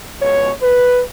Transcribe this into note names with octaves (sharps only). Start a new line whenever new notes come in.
C#2 B2 G#3 C#5
B4